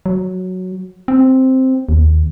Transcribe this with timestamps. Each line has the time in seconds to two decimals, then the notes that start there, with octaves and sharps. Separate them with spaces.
0.06 F#3
1.08 C4
1.89 D#2